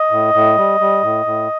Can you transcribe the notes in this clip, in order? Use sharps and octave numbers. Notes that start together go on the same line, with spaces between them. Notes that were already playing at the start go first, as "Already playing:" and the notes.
Already playing: D#5
A2
A2
G3
G3
A2
A2